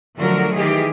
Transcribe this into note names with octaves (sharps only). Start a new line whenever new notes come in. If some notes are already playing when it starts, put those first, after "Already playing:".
D3 F3 F#3 A3 F#4 A#4
D#3 E3 G4 G#4